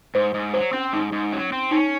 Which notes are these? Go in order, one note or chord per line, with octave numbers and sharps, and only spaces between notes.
G#2 C5
G#2
F#3 C5
C4 C#4
G#2 D#4
G#2
F#3 C#4
C4
C#4 D#4